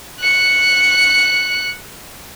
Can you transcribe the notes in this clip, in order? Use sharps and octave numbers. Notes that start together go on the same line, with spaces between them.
F#6 C#7